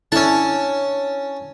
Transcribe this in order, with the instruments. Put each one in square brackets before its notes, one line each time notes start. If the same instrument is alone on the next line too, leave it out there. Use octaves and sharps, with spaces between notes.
[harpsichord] C#4 A5 [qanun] D4 E4 A4